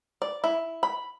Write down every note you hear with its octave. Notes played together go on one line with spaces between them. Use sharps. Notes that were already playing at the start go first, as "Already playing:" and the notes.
D5
E4
B5